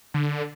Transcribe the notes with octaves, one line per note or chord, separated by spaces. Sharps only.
D3